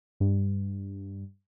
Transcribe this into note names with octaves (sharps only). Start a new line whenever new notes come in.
G2